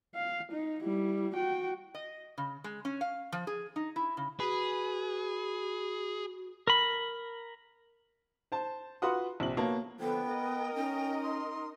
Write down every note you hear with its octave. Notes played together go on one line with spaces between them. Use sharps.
F5
D#4
G3 E4
F#4 G5
D#5
C#3
G#3
C#4
F5
F3
G#4
D#4
E4
C#3
F#4 G#4 B4
A#4 B5
C5 A5
F4 F#4 B4 F#5 C6 D#6
A#1 C3 F#7
A#3 B3 F#4 C#5 A5
D3 F3 B3 G5
A#4 D#5
C#4 D#4
C6